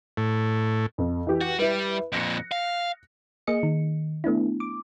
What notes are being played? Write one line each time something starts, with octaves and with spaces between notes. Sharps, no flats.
A2
F2
E3 G4
F#4
G3 E4 B4
F2 A#2 F#6 A#6 C#7
F5
A#3 G#4 D#5 C#7
D#3
A3 B3 D4 E4
D6